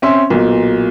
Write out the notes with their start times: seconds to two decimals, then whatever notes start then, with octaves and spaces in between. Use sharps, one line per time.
0.02 C4 C#4 E5 C6
0.30 B1 A#2